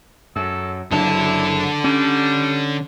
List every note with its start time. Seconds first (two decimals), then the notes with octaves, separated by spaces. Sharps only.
0.36 F#2 A4
0.92 F#1 D3 F#3 D4 E4 A5
1.84 G3 C#4